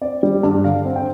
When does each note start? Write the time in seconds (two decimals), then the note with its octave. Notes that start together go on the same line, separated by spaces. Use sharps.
0.01 C4 D5
0.23 G3
0.43 G2
0.64 D3 F5
0.85 C4
0.96 G5